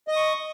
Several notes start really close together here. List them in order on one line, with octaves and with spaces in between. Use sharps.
D#5 D#6 C#6